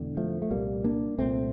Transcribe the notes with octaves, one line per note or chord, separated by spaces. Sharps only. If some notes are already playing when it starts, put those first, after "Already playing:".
Already playing: E1 E2 D3
F3 A3
A3
C2 A#2 G3 A#3
A#3 D4
C2 A#2 A3 C4